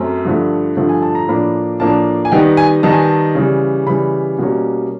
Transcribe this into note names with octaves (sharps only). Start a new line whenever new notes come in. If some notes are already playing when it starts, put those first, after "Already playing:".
Already playing: F#2 A3 C4
G2 D3 F3 A3
G2 D3 F3 A3
G#5
A5
A#5
A2 F3 A#3 D4 B5
A2 F3 A#3 D4 A5
G#5
D#3 G3 B3 D#4 G5
G#5
D#3 G3 B3 D#4 A5
G#5
A5
C#3 E3 G3
C#3 E3 G3 B5
B2 G3 A#3 C#4